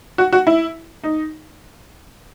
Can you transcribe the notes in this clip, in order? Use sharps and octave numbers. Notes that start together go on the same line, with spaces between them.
F#4
F#4
E4
D#4